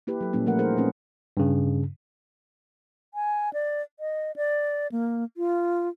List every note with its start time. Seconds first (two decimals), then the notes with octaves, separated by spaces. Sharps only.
0.07 A#3 E4 G4 B4
0.21 F#3 A4
0.33 A#2 G3 A#3 C#4 E4
0.46 F3 A3 A#4 F#5
0.59 D#4 G#4 A#4 C5
0.77 A#2 A3 C4 C#4 B4
1.37 G2 C#3
3.14 G#5
3.53 D5
4.00 D#5
4.36 D5
4.92 A#3
5.37 F4